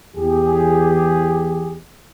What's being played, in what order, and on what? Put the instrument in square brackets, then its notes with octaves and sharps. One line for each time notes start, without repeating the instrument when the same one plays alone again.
[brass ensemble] E2 G4 G#4